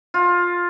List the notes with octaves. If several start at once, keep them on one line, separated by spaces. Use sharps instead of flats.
F4